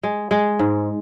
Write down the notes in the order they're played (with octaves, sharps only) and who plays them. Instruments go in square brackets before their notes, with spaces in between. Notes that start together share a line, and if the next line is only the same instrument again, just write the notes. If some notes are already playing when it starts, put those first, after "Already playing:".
[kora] G#3
G#3
G#2